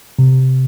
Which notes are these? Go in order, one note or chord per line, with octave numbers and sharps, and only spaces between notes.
C3